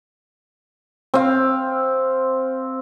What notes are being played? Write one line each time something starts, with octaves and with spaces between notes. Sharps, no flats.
C4 F5